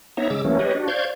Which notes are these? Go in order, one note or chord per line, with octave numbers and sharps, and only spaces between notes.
B3 D#4 C#5 E5 A#5
C#3 G#3 D6 E6
E3 F#3 A3 A#3 C#4
G4 B4 C#5 D#5
D4 F#4
C5 D5 F5 C#6 G6 G#6